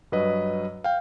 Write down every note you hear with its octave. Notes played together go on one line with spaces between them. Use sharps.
G2 F#3 B4 D#5
F5 G5